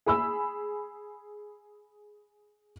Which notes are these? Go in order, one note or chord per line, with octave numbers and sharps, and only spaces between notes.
G#4 B5 E6